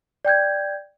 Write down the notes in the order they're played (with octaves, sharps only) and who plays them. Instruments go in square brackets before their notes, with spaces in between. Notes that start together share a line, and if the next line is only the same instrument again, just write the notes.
[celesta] D5 G5 G6 G#6